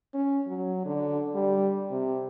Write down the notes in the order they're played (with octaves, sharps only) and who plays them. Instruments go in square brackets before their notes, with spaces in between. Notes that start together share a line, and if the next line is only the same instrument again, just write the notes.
[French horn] C#4
F#3
D3
G3
C3